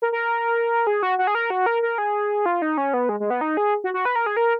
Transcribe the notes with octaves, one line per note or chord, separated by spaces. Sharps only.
A#4
A#4
G#4
F#4
F#4
G#4
A#4
F#4
A#4
A#4
G#4
F4
D#4
C#4
B3
G#3
G#3
B3
D#4
G#4
F#4
F#4
B4
A#4
G#4
A#4